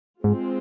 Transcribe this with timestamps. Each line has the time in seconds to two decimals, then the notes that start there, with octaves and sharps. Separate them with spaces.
0.24 G#2 G#3 C4 F4